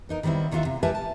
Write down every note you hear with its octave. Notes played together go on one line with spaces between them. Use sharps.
B3 D#4 A#4
D#3 G3 B3 C4 E4
D#2 D#3 C#4 F4 F#4 E5
C3
G4 A#4 B4 E5 G#5 A5
A5